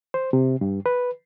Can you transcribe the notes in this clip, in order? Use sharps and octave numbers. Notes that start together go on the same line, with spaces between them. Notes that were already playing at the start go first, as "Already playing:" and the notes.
C5
C3
G2
B4